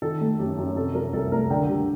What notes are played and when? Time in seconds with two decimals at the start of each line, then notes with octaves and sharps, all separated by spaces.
0.02 D#3 A4
0.21 A3
0.38 F#2 G4
0.58 F#2
0.76 C3 A4
0.95 F#3 A#4
1.13 C2 A4
1.31 A3 A#4
1.50 D3 G5
1.68 G3